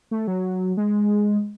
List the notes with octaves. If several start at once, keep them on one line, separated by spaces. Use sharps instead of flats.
A3
F#3
G#3